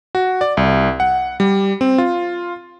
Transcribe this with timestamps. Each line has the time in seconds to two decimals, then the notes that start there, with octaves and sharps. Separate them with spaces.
0.15 F#4
0.41 D5
0.57 C2
1.00 F#5
1.40 G3
1.81 C4
1.98 F4